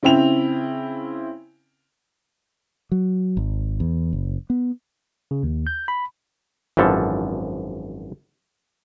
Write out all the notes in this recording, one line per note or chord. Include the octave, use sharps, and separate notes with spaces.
C#3 C4 E4 G5 F7
F#3
G#1
E2
F#1
B3
C#3
D#2
G6
B5
G#1 F#2 E3 F3 A4